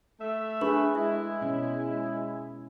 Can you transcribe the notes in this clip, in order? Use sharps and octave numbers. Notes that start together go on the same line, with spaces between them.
A3 E5
D4 G#4 B4 B5 C#6
G#3 E4 E5
B2 C#4